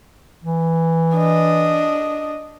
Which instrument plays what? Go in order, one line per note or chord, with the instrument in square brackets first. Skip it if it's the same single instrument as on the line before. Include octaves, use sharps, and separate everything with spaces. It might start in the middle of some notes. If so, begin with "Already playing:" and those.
[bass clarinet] E3
[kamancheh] D4 D#5